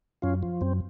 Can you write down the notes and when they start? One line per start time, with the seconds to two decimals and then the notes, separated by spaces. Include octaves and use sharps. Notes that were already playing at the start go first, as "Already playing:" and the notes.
0.22 F#2 C#4 F4
0.43 F3
0.61 F#2 C4